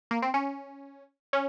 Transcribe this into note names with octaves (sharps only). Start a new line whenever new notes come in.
A#3
C4
C#4
C#4